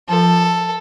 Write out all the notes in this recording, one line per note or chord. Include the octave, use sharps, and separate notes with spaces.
F3 A4